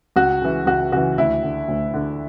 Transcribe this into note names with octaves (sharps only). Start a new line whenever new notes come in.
C#2 F#4
C#3 E3
C#2 F#4
C#3 E3 F#4
D2 E4
D3
D2
D3